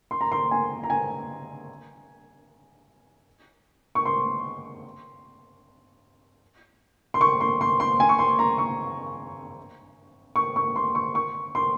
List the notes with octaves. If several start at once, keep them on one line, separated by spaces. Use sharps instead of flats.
C6
A#5
C6
G#5
A#5
G#5
C#6
C6
C6
C#6
C6
C6
C6
G#5
C#6
C6
A#5
C#6
C#6
C#6
C6
C#6
C#6
C6